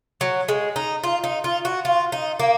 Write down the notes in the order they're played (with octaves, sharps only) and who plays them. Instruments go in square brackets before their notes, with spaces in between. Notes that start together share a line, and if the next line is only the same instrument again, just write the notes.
[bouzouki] F#3
G#3
D#4
F4
D#4
F4
F#4
F4
D#4
A#3